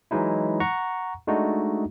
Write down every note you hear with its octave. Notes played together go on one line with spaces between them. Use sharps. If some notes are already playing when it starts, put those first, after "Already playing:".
E3 F#3 G#3 D#4 E4
F#5 A#5 C#6
G#3 A3 D4 D#4 F#4